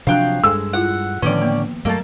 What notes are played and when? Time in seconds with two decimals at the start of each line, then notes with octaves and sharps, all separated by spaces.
0.07 C3 F3 F#3 D4 F5 G5 F#6
0.44 G2 G#3 A4 E6
0.73 E4 F4 F#5
1.22 A2 D3 D#3 F3 B3 C#4 D5
1.42 A#3 B3
1.85 G2 F#3 A3 A#3 A5